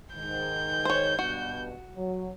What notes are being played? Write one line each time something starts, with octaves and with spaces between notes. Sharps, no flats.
G#2 D#3 G6
C5 C#5
G2 B2 F#4
F#3